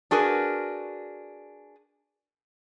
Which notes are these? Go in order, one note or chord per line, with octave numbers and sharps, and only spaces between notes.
D4 F#4 G#4 A#4 B4